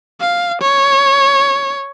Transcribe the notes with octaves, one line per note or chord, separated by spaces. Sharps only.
F5
C#5